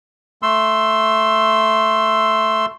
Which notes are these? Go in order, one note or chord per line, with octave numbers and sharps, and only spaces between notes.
A3 C6 E6